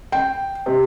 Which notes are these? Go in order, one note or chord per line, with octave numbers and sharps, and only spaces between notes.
G5
C3